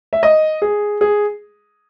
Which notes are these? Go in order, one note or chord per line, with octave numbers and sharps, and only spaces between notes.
E5
D#5
G#4
G#4